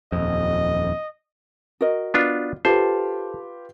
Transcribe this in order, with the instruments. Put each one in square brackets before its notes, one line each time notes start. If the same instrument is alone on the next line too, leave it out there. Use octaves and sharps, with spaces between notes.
[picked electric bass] D#1 F2 [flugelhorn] D#5
[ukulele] F#4 A#4 D#5
[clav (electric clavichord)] B3 D4 F4
[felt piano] F4 G4 B4 [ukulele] A4 [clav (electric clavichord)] C5